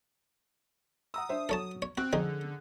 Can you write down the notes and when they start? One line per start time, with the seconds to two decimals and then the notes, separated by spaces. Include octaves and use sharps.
1.14 F#5 A#5 D#6 E6
1.29 D4 C5 E5
1.49 F#3 A4 C#5 A5
1.82 C#5
1.98 C4 F#4 F#6
2.13 F2 D3 C4 D#4 G#4